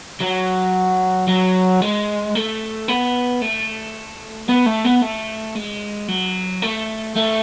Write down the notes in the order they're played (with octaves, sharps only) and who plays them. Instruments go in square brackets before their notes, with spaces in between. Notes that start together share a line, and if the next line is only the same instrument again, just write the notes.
[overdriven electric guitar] F#3
F#3
G#3
A3
B3
A3
B3
A3
B3
A3
G#3
F#3
A3
A3